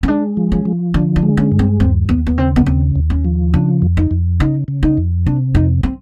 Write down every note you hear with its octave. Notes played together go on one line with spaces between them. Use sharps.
C#4
G#3 D4
F3
C#4
F3
D3 D4
D4
G#3
C#4
G2
C4
D#2 C4
D#2 B3
B3
C#3 C4
B3
D#2 C4
D#2
C#4
F3
C#3 D4
F2
D#4
F2
C#3 D#4
C#3
D#4
F2
C3 D4
F2 D#4
C4